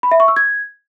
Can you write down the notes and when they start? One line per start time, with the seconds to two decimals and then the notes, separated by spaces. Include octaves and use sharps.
0.03 B5
0.11 E5
0.20 C#6
0.28 E6
0.36 G#6